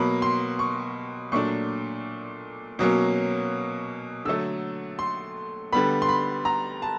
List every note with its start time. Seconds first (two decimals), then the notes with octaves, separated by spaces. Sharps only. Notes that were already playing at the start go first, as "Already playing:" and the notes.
Already playing: B2 F#3 A#3 B5
0.22 C6
0.59 C#6
1.32 A#2 F#3 A3 D4 C#6
2.79 B2 F#3 A#3 C#4
4.25 D3 F#3 A3 E6
4.99 C6
5.73 D3 G3 B3 B5
6.02 C6
6.09 B5
6.45 A#5
6.82 A5